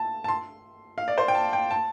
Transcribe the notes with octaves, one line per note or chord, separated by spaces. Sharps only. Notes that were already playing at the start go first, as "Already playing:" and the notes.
Already playing: A5
A5
C6
F5
D5
C5
G5
A5
G5
A5